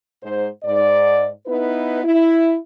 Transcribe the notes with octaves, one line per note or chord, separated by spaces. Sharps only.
G#2 C5
G#2 D5
B3 D#4 E4 B4
E4